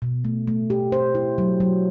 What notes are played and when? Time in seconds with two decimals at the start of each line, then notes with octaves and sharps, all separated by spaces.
0.02 B2
0.25 A3
0.47 A3
0.70 G4
0.92 C5
1.15 E4
1.38 F#3
1.60 F#3